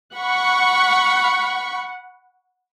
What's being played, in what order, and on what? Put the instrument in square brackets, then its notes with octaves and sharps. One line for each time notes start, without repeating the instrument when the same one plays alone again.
[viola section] F#5 [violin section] B5 C#6